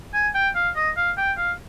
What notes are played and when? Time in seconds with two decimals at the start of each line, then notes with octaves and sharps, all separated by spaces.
0.13 G#5
0.34 G5
0.55 F5
0.76 D#5
0.97 F5
1.17 G5
1.37 F5